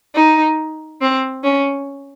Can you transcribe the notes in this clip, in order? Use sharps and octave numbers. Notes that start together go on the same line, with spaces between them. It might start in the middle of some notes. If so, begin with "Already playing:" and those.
D#4
C4
C#4